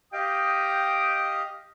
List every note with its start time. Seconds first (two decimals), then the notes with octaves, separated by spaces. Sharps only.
0.13 G4 D#5 F5 G5 D#6